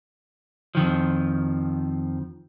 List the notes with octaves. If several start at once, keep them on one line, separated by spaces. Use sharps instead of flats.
F2 D#3 F3